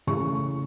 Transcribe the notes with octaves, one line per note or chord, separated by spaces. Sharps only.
C#3 E3 A3 C#6